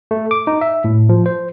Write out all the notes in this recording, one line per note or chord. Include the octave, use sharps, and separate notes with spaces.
A3
D6
D#4
E5
A2
F3
C5